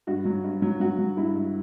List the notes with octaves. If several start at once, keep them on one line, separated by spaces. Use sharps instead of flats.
G2 F#4
F#3
G2
F#3
F#3 F#4
F#3
G2 E4
G2